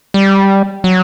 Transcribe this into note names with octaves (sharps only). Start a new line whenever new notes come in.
G3
F#3